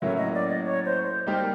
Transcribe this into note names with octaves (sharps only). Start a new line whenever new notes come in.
A2 F#3 A#3 C#4 E5
D#5
D5
D#5
C#5
C5
C5
G3 A#3 D#4 G4 A#4